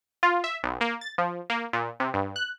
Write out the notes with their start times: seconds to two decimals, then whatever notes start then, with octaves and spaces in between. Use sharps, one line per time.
0.23 F4
0.44 E5
0.63 B1
0.81 A#3
1.01 A6
1.18 F3
1.50 A#3
1.73 A#2
2.00 C3
2.14 G2
2.36 F#6